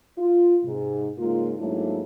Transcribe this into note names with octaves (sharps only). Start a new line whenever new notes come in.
F4
G#2 C3
G#2 C#3 A#3 F4
G#2 F#3 A3 A#3 D4 E4